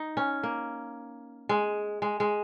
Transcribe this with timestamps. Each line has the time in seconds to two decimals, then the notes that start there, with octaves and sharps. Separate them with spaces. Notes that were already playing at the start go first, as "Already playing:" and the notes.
Already playing: D#4
0.17 C#4
0.43 A#3
1.49 G#3
2.02 G#3
2.20 G#3